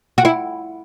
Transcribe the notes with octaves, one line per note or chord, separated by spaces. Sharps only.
F#4
E4